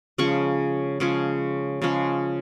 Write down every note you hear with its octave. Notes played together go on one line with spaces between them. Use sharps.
C#3 F3 G#3 C#4 C#6
C#3 F3 G#3 C#4
C#3 F3 G#3 C#4